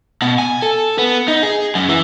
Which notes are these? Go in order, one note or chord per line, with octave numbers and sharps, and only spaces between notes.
B2
G#5
A4
B3
D#4
G#4
F#2
E3